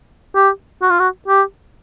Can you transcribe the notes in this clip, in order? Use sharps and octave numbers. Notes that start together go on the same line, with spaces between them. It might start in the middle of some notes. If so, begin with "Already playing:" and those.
G4
F#4
F4
F#4
G4